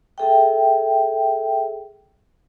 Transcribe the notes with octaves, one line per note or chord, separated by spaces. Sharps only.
G#4 A4 E5 G5